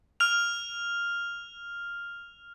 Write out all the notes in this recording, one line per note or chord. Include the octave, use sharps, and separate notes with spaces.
F6 F7